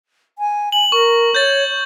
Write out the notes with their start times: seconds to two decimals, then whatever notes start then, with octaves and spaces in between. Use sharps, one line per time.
0.39 G#5
0.72 G#5 F#7
0.92 A#4 C#6
1.35 C#5 G6 A6